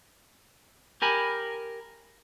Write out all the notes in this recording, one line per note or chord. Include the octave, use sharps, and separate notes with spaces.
G4 A#4 G#5 B5